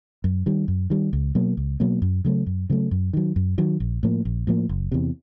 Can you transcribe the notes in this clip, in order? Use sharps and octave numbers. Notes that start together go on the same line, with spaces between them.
F#2
D#3 G3
F#2
D#3 G3
C#2
B2 F#3 A#3
C#2
B2 F#3 A#3
F#2
C#3 F#3 A3
F#2
C#3 F#3 A3
F#2
D#3 F#3
F#2
D#3 F#3
A#1
A2 F3 A#3
A#1
A2 F3 A#3
F#1
E2 C3